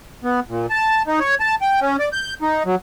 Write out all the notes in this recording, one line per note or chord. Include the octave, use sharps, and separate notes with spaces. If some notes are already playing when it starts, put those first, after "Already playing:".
B3
A#2
A5
D#4
C#5
A5
G5
C#4
D5
G6
D#4
F#3